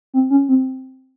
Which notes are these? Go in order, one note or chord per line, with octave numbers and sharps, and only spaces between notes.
C4
C#4
C4